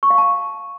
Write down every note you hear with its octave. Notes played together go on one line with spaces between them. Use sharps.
C#6
F5
A5